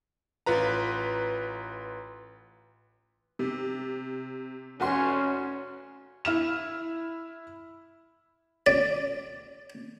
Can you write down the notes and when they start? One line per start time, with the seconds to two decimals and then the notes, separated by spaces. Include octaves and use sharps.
0.46 A1 F4 B4 A#5
3.39 C3
4.80 F1 C#4 F#4 C6
6.25 E4 F6 E7
8.67 D5